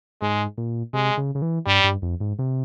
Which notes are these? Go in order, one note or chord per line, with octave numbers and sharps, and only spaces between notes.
G#2 G#3
A#2
C3 G#3
C#3
C#3
E3
G2 G3
G2
F2
G#2
C3